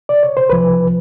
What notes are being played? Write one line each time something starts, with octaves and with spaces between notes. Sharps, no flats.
D5
C#5
C5
C2 C3 F3 B4